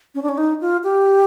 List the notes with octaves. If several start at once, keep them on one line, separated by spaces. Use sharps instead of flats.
C#4
D4
C#4
D#4
F4
G4